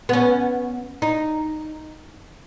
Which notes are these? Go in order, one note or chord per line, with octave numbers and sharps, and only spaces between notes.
B3 C#4
D#4